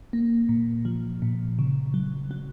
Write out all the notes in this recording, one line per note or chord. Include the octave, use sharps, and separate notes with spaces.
A#3
A#2
F3
A#2
C#3
F#3
F#3